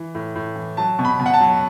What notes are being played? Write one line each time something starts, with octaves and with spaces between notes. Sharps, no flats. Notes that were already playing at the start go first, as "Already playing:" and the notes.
Already playing: E3
A2
A2
E3
F#3 A5
B2
B5
B2
F#5
A5
F#3